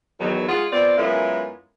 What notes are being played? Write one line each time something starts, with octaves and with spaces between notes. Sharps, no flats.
E2 D#3 F#3
G#3 F4 G#4 F#5
B3 C4 F4 D5
F#2 G#3 B3 E4 F4 A#4